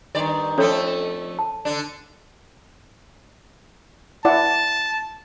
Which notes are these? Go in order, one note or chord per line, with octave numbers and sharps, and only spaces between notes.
G2 D#3 D5
F2 A3 C#4 A4 C#5
A5
D3 D4
E4 D5 F#5 A5